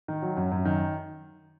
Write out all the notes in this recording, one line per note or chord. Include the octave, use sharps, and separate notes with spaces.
D#3
F#3
F#2
F#2
D#3